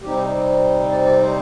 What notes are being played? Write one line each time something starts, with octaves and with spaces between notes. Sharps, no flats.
C3 G3 C4 D#4 G4
D5
D5
C5